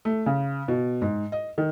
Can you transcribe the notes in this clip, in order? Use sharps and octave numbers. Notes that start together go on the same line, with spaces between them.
A3
C#3
B2
G#2
D#5
D#3